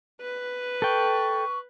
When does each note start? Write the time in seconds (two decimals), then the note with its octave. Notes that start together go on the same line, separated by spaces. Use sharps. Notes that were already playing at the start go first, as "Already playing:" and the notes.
0.22 B4
0.82 A4 G5 C#6